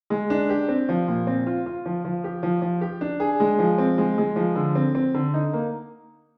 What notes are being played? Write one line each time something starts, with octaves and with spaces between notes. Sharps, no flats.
G#3
D4
G4
C4
F3
A#2
C4
F4
F4
F3
F3
G4
F3
F3
G4
D4
G#4
G#3
F3
C4
G#3
G#3
F3
D3
C4
C4
D3
D#4
A#3